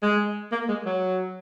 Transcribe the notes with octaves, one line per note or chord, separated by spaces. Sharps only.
G#3
A#3
G#3
F#3